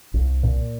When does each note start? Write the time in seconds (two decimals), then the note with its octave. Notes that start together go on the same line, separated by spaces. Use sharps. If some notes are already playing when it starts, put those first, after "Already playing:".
0.14 C2
0.43 A#2